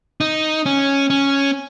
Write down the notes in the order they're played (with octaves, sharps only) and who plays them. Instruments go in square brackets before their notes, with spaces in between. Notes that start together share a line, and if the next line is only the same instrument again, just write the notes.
[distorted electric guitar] D#4
C#4
C#4